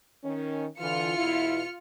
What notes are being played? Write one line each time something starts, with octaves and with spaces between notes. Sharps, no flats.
D#3 C#4
D3 E3 F4 F6 C#7
E2 B2 E4